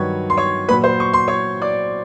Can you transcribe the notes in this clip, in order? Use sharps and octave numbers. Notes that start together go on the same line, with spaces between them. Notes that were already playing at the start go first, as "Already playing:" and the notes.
Already playing: G2 D#3 F#3 B4 C#5 C#6
C6
C#5 C#6
A#2 F#3 B4 B5
C5 C6
C#6
C6
C#5 C#6
D5 D6